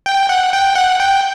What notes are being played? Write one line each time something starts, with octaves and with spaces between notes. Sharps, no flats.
G5
F#5
G5
F#5
G5